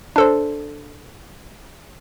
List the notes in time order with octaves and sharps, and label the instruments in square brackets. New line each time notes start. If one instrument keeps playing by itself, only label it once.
[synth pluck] D4 A4 C5